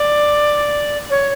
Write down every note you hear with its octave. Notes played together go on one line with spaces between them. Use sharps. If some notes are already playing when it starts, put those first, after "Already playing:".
Already playing: D5
C#5